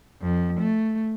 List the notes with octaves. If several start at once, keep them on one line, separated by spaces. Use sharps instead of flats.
F2
A3